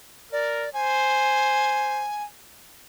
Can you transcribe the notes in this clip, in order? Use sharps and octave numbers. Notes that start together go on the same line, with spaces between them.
A#4 D5
C5 G#5